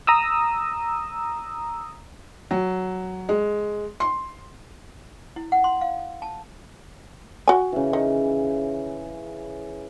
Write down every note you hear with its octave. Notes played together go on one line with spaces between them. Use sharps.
A#5 D#6 E6
F#3
G#3
C6
E4
F#5
C6
F5
A5
F#4 G#5
C#3 E3
D#3